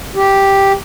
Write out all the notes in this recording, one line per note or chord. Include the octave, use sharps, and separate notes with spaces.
G4